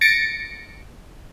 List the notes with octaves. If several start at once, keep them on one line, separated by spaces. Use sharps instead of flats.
A6 A#6 C#7 D7